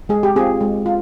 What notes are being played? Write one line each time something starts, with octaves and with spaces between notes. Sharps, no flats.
G#3 G#4
G4
C4 F4 G#4
G#3
F4